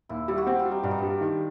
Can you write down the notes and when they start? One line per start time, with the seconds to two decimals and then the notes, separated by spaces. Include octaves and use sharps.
0.09 D#2 E4
0.28 G3 E4
0.38 F#4
0.47 C4 G4
0.59 F4
0.65 G3
0.71 D#4
0.83 G2 D4
0.91 D#4
0.98 G3 D4
1.21 D#3